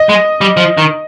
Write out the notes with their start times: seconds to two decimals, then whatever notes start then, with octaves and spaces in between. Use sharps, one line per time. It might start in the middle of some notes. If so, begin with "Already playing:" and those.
Already playing: D#5
0.09 G#3
0.41 G3
0.57 F3
0.78 D#3